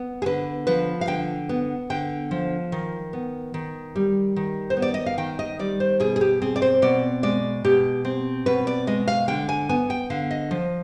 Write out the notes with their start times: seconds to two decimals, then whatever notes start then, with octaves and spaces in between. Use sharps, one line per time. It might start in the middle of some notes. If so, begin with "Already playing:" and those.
Already playing: B3
0.22 G#4
0.26 D3 B4
0.67 F3 B4
1.01 F5
1.07 D3 G5
1.49 B3
1.90 D3 G5
2.31 F3
2.72 D#3
3.13 B3
3.54 D#3
3.96 G3
4.36 D#3
4.70 C5
4.77 B3
4.82 D5
4.94 D#5
5.06 F5
5.18 D#3 G5
5.39 D#5
5.59 G3 D5
5.80 C5
6.00 B2 G#4
6.16 G#4
6.21 G4
6.42 C4 G#4
6.56 D5
6.62 C5
6.82 B2 D5
7.23 G#3 D5
7.64 B2 G4
8.05 C4
8.46 B2 B4
8.67 D5
8.87 G#3 D#5
9.08 F5
9.28 D3 G5
9.49 G#5
9.69 B3 G#5
9.90 G5
10.10 D3 F5
10.31 D#5
10.51 F3